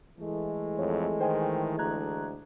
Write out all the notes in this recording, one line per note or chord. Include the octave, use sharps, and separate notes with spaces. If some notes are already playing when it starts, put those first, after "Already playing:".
E3 G#3 A3
F2 C#5
D#3 C5 G5 G#5
D2 A#5 F#6 G#6